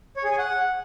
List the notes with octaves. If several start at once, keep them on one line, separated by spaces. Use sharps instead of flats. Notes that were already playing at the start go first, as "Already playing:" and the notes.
C#5
G#4
G#5
F#5